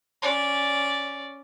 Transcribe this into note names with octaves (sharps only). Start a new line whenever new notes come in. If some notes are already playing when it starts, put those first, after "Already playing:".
C#4 D5